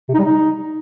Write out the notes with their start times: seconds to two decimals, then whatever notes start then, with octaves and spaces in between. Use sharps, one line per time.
0.09 C3
0.14 D#4
0.19 G3
0.24 D#4